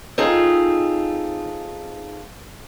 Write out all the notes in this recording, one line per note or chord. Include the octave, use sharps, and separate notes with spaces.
C4 D#4 F4 G#4 A4